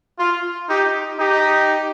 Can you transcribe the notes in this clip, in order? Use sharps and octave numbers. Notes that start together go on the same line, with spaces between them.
F4
D#4 G4
D#4 G4